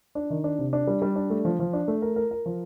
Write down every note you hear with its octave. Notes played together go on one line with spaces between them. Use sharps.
D4
D#3
D4
C3
D4
G3
G3
D4
A3
F3
F3
D4
A3
A#4
A#4
A#4
F3